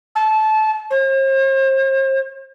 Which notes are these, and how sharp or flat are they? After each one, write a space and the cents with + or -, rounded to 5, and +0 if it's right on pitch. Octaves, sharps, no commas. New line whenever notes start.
A5 -20
C5 +45